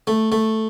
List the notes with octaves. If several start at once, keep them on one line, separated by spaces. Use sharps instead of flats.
A3
A3